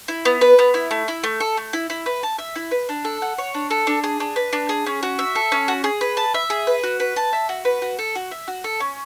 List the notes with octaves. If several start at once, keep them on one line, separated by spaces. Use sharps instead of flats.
E4
B3
B4
B3
E4
A3
E4
A3
A4
A3
E4
E4
B4
A5
E5
E4
B4
D4
A4
F#5
C#5
D4
A4
D4
G#4
D4
B4
D4
G#4
C#4
F#4
E5
A4
C#4
F#4
G#4
B4
A5
E5
G#4
B4
F#4
B4
A5
E5
F#4
B4
F#4
A4
F#4
E5
F#4
A4
C#4